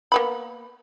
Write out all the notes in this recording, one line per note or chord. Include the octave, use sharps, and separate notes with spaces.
A#3 B3 B5